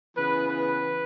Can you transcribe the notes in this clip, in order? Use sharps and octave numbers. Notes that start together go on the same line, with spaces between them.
C#3 E3 B3 B4
B4